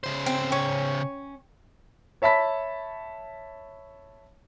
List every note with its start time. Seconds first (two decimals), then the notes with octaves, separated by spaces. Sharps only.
0.04 C#3 C5
0.26 C4
0.52 C#4
2.22 C#5 E5 A5 B5 B6